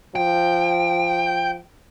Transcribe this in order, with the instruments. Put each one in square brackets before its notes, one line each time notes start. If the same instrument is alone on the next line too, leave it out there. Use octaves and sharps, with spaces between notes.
[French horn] F3 [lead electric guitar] G5